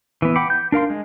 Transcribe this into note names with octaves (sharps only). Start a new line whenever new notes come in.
E3 B3
F#5 G5 B5 D6
G6
D4 A#4 F5 C6
G#3